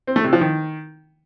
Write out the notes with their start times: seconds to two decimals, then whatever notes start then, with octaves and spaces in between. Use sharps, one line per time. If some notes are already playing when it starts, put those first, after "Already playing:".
0.07 C4
0.16 A3
0.24 C3
0.33 F3
0.41 D#3